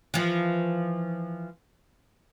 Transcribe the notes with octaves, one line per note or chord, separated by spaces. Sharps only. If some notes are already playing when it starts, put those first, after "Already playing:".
E3 F3